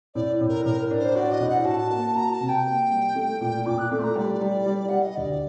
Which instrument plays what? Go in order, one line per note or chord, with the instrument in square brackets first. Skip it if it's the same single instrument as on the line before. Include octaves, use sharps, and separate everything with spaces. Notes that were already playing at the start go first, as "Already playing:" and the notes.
[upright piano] A2 [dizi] D5
[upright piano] A2
[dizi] A#4
[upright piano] A2 [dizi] A#4
[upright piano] D4
[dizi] C5
[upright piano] F#4 [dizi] D5
[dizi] D#5
[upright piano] A2
[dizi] F#5
[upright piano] F#4 [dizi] A5
[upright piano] A#3
[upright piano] F#4 [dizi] A#5
[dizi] A5
[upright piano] C3
[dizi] G5
[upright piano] A#3
G3
A3
A#2
[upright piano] A#2 [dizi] D6
[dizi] F#6
[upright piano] A3 [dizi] D6
[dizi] C6
A#5
[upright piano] G3 [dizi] D5
[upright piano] G3
G3
[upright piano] G3 [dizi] F#5
[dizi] D#5
[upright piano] D2 [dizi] D5